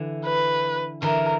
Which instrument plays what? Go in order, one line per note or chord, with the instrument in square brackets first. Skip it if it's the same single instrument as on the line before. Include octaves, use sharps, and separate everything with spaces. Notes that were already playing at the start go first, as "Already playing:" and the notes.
Already playing: [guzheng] D3 E3
[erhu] B4
[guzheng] D3 E3 [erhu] A#4